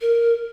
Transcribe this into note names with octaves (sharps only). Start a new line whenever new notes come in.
A#4